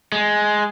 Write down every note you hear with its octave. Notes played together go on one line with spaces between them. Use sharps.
G#3